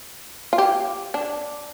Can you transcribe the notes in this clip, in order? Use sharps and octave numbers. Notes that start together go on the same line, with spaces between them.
F4
G4
D4